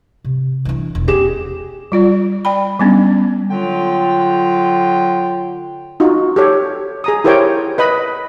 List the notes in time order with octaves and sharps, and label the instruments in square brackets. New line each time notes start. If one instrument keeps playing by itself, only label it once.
[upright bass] C3
E3 D4
E1
[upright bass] B3 C#4 [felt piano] G4 G#4 E7
[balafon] G3 F4 D5
D5 G5 B5
G3 B3 C#4 D4
[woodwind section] D3 F#3 F4 G5
[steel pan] D#4 F4 F#4
G4 A4 C#5
G#4 A#5 D#6
E4 G4 A#4 C5 C#5 G5
B4 D#5 B5